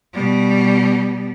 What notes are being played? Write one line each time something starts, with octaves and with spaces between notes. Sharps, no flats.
B2 G3